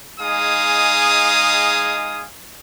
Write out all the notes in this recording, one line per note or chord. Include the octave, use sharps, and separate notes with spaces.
G#3 D#4 G#4 F5 G#5 D#6